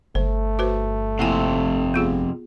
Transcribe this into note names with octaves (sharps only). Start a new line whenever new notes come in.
G1 A3 C5
F#4 B4 C5
F2 C3 A#3 E4 G#5
B3 F4 G#4